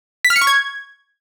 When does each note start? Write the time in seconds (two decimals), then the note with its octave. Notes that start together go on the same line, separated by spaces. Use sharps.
0.25 B6
0.30 F6
0.36 C#7
0.41 C#6
0.47 G#6